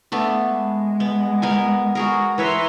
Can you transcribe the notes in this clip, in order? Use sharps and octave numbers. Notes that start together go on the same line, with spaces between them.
A3 B3 D4
G#3
B3
B3 A#4 G#5
F#4 G#4 A#4
E3 B4 C#5 E5 A#5 C6